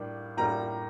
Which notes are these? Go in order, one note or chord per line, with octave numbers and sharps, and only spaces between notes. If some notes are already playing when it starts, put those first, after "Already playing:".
Already playing: A2 G3 A#3 D4
A2 G3 A#3 D4 A#5